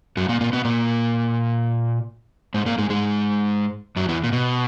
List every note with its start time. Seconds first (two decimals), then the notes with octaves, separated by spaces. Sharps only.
0.17 F#2 F#3
0.29 A#2 A#3
0.41 A#2 A#3
0.53 B2 B3
0.65 A#2 A#3
2.54 G#2 G#3
2.66 A#2 A#3
2.78 G#2 G#3
2.90 G#2 G#3
3.96 F#2 F#3
4.09 E2 E3
4.24 A#2
4.33 B2